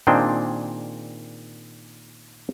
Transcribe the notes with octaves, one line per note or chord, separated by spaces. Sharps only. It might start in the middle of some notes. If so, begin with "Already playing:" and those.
A#2 D#3 C4 D4 G#4 G5